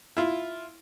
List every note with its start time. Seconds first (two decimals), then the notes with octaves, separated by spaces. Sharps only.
0.17 E4 F4